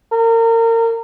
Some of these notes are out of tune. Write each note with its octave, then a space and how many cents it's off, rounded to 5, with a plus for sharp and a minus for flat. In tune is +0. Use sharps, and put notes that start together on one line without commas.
A#4 -30